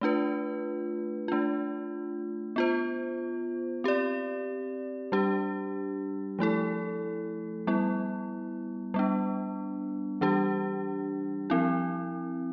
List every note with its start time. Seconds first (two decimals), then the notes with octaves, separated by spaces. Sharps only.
0.01 A3 D4 F4 B4
1.28 A3 D4 F4
2.56 B3 F4 C5
3.84 C4 G4 D5
5.12 G3 D4 G4
6.39 F3 A3 E4 A4
7.67 G3 B3 E4
8.94 G3 B3 D4
10.21 E3 G3 D4 G4
11.50 F3 C4 E4